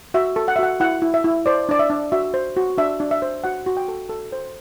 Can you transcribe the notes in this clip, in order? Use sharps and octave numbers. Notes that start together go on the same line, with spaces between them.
F#4 E5
A4
F#5
E5
F#4 F#5
E4 F#5
E4
E5
E4
C5 D5
D4 D5
E5
D4
F#4 E5
C5
F#4
D4 E5
D4
E5
C5
F#4 F#5
F#4
G5
A4
A4
C5